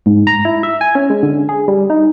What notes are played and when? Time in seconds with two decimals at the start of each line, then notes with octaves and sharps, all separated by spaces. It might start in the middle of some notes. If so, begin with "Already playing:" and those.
0.06 G#2
0.27 A#5
0.45 E4
0.63 E5
0.81 G#5
0.95 C#4
1.10 G#3
1.23 D3
1.49 G#4
1.68 G3
1.90 D#4